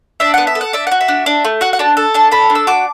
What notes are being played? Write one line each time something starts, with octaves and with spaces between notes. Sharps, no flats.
D4 E5
B3 F#5
E5
A4
F#5
D4 E5
F#4 F#5
E5
D4
D4
A3
F#4 F#5
F#5
D4 A5
A4
D4 A5
A4 B5
D4
E6
F#4 D6